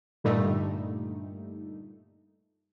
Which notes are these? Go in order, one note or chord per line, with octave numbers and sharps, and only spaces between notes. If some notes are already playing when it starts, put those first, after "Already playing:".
G2 A#2 D3 G3 A3 D#4